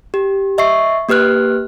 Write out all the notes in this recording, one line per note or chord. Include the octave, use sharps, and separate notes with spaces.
G4
D#5 E5 C#6 C7
A#3 G4 B4 F6 F#6